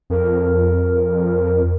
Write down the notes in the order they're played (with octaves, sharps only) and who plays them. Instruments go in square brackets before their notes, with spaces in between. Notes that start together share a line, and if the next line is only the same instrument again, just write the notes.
[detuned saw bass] F2 [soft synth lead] A#4